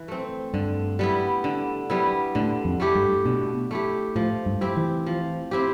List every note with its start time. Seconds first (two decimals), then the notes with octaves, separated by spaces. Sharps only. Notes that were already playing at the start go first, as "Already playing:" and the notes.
Already playing: E3
0.08 A3 C4
0.53 G2 D3
0.99 G3 B3 E4
1.44 D3
1.90 G3 B3 E4
2.35 A2 D3
2.65 F2
2.80 A3 E4 G4
2.95 G2
3.25 B2 D3
3.71 A3 E4 G4
4.15 A2 F3
4.46 G2
4.61 C4 E4 G4
4.77 E3
5.06 F3
5.51 C4 E4 G4